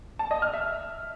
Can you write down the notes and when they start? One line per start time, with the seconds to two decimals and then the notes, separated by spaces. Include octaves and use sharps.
0.19 A5
0.31 D#5
0.42 F6
0.54 E5